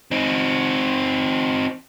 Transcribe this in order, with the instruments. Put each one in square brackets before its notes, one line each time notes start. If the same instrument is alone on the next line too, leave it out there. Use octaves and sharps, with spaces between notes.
[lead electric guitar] C4 D#4